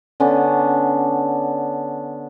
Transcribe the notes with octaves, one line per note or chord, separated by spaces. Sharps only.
D3 B3 C#4 D4